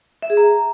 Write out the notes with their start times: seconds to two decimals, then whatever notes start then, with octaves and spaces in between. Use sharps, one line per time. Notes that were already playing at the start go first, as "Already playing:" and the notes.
0.22 E5
0.30 G#4
0.37 A#5